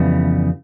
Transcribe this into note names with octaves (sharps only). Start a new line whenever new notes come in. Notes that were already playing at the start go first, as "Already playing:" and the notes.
Already playing: F2 C#3 E3 G3 B3